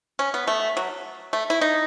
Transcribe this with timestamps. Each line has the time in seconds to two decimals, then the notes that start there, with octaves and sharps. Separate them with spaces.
0.19 C#4
0.34 B3
0.47 A3
0.77 F#3
1.33 A3
1.50 E4
1.61 D#4